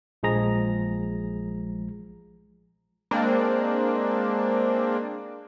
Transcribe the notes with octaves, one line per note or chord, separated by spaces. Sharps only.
A#1 F3 G#3 G#4 A#5 A#6
G#3 A#3 C4 D4